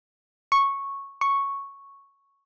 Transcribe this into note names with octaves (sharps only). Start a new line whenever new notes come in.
C#6
C#6